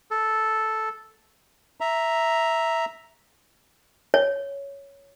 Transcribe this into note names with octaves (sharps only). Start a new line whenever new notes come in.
A4
E5 A#5
C#5